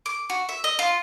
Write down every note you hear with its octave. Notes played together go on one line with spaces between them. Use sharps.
D6
F#4
E5
D#5
F4